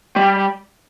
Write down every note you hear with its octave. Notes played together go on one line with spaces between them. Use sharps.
G3